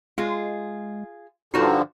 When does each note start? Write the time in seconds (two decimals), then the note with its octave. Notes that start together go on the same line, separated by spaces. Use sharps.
0.18 G#3 F4 G#4
1.54 G2 D3 F3 D#4 F4 F#4 C5